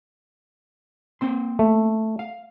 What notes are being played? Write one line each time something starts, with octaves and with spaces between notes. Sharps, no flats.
A#3 C4 C6
A3
F5